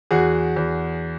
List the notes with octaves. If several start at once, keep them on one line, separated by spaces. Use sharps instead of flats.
E2 F#4 G#4
E2